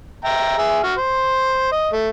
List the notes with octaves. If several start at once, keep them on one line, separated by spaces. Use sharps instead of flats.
E5 G5 A#5
G#4 E5
F#4 F6
C5
D#5
A3